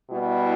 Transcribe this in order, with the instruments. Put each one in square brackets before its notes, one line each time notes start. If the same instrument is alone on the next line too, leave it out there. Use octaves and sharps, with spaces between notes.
[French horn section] B2 G3 B3 E4